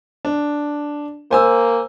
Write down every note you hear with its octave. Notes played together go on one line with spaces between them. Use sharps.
D4
A#3 C5 G#5 E6